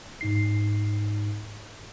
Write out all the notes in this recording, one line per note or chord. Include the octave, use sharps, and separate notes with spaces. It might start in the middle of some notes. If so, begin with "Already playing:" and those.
G#2 D#4 C7